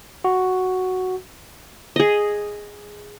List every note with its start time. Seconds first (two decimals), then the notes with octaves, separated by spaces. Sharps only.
0.24 F#4
1.96 G#4 D#5